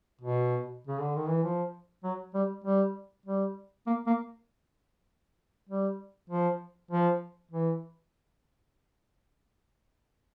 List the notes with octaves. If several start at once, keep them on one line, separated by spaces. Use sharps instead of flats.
B2
C#3
D3
D#3
E3
F3
F#3
G3
G3
G3
A#3
A#3
G3
F3
F3
E3